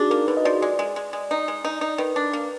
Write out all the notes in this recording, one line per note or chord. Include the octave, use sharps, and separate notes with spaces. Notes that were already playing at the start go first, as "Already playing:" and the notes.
Already playing: D4 D#4 F#4 G#4
A#3 A#4
D3 B4
D#5
F3 D5
G#3 D5
G#3
G#3
G#3
D#4
G#3
D#4
D#4
D#3 B4
D4
A#3